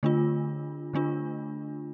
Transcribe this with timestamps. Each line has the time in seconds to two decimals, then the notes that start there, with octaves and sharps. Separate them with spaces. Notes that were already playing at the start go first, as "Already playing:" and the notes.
0.03 D3 A3 D4 F4
0.93 D3 A3 D4 F4